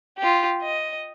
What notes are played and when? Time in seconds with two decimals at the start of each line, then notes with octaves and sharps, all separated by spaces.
0.18 F4 G4
0.62 D#5